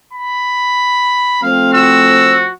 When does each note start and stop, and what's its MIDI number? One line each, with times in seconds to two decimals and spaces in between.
0.13 1.38 83
1.43 2.50 53
1.43 2.50 57
1.43 2.50 60
1.43 1.72 77
1.74 2.51 66
1.74 2.33 88